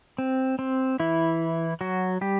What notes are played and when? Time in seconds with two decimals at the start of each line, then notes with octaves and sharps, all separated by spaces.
0.18 C4
0.59 C4
1.00 E3 E4
1.81 F#3 F#4
2.21 G3 G4